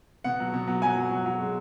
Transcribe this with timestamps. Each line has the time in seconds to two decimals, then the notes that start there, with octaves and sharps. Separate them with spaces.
0.24 B2 F#5
0.40 F#3
0.53 B2
0.68 F#3
0.82 F#3 G#5
0.97 F#3
1.11 F#3
1.26 F#3
1.40 G#3